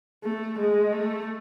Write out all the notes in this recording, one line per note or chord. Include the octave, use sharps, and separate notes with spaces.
A3
G#3
A3